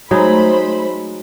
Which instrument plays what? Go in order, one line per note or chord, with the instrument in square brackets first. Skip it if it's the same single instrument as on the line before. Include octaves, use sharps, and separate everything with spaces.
[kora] F#3 G#3 D#4 [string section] A3 C5 B5